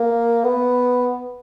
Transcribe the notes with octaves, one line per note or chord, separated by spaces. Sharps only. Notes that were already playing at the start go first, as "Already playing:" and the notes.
Already playing: A#3
B3